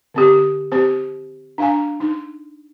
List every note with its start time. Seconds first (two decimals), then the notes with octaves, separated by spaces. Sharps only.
0.14 D3 C4 G4
0.72 C4 G4 C5
1.58 D4 F5 G#5
2.00 D#4